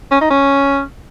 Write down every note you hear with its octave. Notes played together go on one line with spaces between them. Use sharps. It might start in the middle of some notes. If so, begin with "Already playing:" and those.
C#4
D#4
C#4